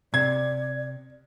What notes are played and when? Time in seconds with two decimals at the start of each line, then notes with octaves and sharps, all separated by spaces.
0.14 C3 D5 G#6